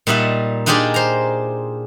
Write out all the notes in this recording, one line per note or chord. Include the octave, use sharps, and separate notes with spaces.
A#2 G3 D#4 E5 F#5
D4 D#4 F4 G4 G#4 D5
C5 A#5